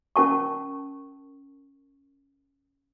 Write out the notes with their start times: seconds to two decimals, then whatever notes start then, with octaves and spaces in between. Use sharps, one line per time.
0.16 C#4 A#4 A5 C#6